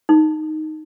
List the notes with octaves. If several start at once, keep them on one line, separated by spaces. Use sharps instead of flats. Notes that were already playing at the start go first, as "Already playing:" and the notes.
D#4